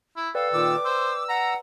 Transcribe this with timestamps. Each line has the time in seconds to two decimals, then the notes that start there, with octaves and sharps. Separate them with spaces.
0.17 E4
0.35 A4 B4 D5 F5 G5
0.53 A#2 D#3 D6 E6
0.85 C5 E6
1.29 F#5 A#5